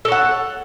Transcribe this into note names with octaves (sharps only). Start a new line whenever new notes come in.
A4 C#5 F#5